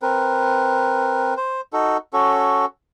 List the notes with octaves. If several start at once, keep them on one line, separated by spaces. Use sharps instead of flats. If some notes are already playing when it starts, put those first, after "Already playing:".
C4 A#4 B4
C5
D#4 F#4 A4
C#4 F#4 A4